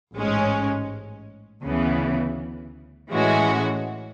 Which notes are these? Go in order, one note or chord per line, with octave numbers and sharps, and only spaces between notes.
A1 G#2 G#3 C#4
D2 C#3 E3 B3
A2 E3 G#3 C#4 F#4